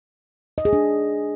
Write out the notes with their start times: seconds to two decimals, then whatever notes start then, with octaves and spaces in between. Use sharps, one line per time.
0.58 D#5
0.65 G#4
0.73 D4